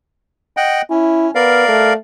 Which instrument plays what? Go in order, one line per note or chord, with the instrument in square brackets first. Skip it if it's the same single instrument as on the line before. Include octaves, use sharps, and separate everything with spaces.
[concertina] D#5 F#5 G5
[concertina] C#4 [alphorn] E4
[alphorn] B3 [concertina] A#4 D5 F5
[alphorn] A3